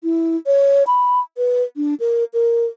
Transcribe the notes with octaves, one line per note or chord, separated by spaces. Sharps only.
E4
C#5
B5
B4
D4
A#4
A#4